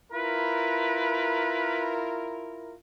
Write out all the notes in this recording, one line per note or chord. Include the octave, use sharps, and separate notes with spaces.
E4 F4 A#4 B4